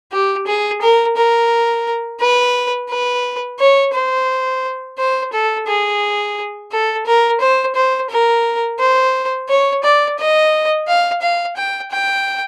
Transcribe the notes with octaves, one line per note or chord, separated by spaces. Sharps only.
G4
G#4
A#4
A#4
B4
B4
C#5
C5
C5
A4
G#4
A4
A#4
C5
C5
A#4
C5
C#5
D5
D#5
F5
F5
G5
G5